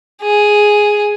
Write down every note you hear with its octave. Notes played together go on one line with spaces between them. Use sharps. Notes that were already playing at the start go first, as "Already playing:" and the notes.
G#4